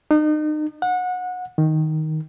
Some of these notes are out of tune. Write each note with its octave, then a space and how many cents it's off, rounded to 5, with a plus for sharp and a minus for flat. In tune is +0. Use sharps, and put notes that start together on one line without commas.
D#4 -35
F#5 -25
D#3 +5